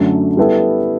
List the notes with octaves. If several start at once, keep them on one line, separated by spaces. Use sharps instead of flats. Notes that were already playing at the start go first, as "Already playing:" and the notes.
Already playing: F#2 D3 F#3 A3 C#4
G3 B3 E4 A4